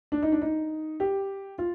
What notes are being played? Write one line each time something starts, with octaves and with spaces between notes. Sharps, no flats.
D4
D#4
D4
D#4
G4
F4